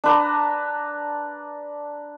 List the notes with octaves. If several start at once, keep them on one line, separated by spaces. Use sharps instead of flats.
D4 B4 A#5